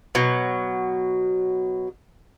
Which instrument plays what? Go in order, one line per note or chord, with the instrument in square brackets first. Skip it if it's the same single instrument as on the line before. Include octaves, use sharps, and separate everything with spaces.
[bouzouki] B2 F#3